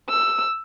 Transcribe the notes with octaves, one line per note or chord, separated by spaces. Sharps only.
E6